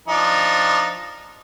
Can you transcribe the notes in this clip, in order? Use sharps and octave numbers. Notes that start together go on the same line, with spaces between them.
F3 D4 D#4